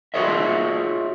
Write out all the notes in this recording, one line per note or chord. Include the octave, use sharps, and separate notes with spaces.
F4 F#4 G#4 C#5 D#5 E5